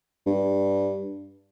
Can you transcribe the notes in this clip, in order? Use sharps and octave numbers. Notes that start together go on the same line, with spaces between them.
G2